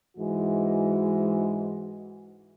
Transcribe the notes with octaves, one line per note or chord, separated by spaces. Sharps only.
G#2 E3 G#3 F#4